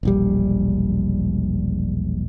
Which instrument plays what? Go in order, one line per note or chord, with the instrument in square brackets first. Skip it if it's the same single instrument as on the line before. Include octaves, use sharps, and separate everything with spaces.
[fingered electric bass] E1 A#1 G3